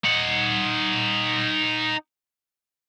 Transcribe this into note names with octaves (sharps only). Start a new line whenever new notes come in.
D#4 F#5